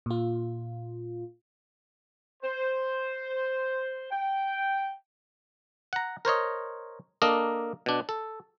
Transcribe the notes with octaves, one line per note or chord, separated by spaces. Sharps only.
A#2 F4
C5
G5
F#5 A#5
A#4 C5 C#5 D#5
A#3 D4 A4 A#4 D#5
B2 D4
A4